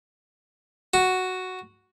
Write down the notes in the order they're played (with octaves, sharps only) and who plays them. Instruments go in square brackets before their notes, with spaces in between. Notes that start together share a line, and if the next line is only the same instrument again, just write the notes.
[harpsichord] F#4